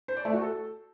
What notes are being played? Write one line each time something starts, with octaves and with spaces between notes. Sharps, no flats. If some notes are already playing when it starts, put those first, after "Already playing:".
C5
D5
A3
F#4
A4